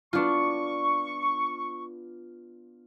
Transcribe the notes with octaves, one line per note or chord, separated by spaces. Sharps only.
B3 D4 F4 C#6